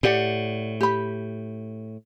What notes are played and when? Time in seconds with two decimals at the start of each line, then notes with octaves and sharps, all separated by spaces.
0.03 A2 G4 D5 F#5
0.81 G4 B5